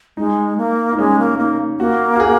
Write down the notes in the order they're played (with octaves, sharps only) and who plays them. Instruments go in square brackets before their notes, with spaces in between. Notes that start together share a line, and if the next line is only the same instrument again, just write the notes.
[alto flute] G#3 [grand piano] D#4
[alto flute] A#3
[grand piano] D#4
[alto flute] G#3 [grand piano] C#4
[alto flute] A#3
[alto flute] A#3 [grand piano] D#4
[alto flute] A#3 [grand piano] F#4
[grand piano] F#4
G#4